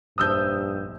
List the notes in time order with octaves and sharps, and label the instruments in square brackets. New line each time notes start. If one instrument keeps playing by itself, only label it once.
[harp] F1 A#1 [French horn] G2 [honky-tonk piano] D#6 E6 G6